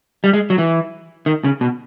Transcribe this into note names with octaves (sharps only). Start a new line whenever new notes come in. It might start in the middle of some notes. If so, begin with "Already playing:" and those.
G3
G#3
F#3
E3
D#3
C#3
B2